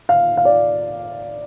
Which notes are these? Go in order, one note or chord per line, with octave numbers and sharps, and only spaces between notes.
F5
F5
D5